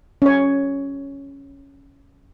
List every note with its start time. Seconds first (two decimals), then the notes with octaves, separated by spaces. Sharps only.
0.22 C#4 C#5